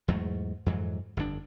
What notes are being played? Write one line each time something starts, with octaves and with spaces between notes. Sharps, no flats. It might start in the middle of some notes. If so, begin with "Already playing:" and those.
E2 G#2 F#3 A3
F2 G#2 E3 F#3
G1 F2 C3 D4